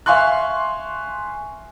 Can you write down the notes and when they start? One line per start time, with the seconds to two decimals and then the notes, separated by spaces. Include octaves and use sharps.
0.06 E5 F5 G#5 C6 C#6 F#6